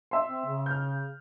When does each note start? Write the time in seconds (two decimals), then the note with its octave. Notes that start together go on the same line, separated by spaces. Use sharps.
0.11 E5 C6
0.27 C4
0.46 C#3
0.66 F6 G6